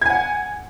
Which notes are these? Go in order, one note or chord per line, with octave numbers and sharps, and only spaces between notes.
F#5 G#5 G#6